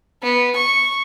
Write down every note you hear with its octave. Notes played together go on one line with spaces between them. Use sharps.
B3
C#6